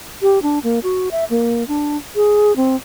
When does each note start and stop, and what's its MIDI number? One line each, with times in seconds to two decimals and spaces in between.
0.22 0.39 67
0.43 0.59 62
0.63 0.79 58
0.83 1.09 66
1.11 1.25 76
1.30 1.66 58
1.68 1.97 62
2.15 2.55 68
2.56 2.76 60